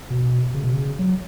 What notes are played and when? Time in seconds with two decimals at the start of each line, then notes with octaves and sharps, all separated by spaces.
0.10 B2
0.54 C#3
0.64 B2
0.73 C#3
0.99 F#3